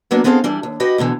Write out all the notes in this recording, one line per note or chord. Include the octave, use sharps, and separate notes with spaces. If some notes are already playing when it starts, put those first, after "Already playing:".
F#3 A#3 B3 D4
B3 C4 G#4 A4 E5 F5
E3 G3 D4
D#2
F#4 G4 B4 D#5
D2 B2 D3 E3